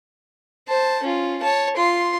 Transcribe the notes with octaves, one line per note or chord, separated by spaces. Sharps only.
C5 A5
C#4 F4
C#5 A5
F4 C6